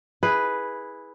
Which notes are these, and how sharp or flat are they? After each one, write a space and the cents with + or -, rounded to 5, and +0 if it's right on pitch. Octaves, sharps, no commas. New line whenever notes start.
E4 -20 G#4 +0 B4 +0